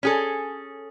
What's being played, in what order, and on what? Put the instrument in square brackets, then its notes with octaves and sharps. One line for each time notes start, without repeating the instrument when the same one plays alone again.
[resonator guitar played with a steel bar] C#4 G#4 A4